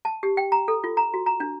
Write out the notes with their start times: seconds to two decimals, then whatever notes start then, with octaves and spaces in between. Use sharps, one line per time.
0.05 A5
0.23 G4
0.37 G5
0.52 A#5
0.68 A4
0.84 F4
0.97 A#5
1.14 F#4
1.26 A#5
1.40 D4